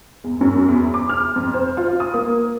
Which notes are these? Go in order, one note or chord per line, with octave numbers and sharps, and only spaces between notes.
E2
F#2
E2
D6
F6
F2
C5
F4
D#6
A#3